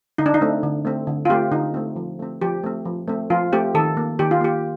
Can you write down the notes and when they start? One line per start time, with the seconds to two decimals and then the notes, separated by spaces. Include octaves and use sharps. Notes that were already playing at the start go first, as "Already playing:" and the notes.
0.18 D3 D#4
0.26 D4
0.34 D#4
0.41 A3 C4
0.63 D3
0.85 A3 C4
1.07 D3
1.25 F4
1.29 A3 C4 G4
1.52 D3 D#4
1.74 A3 C4
1.96 F3
2.20 A3 C4
2.42 F3 G4
2.64 A3 C4
2.85 F3
3.08 A3 C4
3.30 F3 F4
3.52 A3 C4 G4
3.74 D#3 A4
3.97 A#3
4.19 D#3 G4
4.31 F4
4.41 A#3 G4